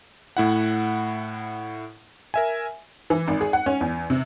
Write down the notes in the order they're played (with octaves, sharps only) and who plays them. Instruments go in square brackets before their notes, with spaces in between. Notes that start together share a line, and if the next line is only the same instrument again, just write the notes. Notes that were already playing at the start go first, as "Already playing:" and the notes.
[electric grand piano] A2 E4 F#5
A#4 E5 G#5
[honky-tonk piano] E3
G#1
G#4
F#5
C#4
E2
C3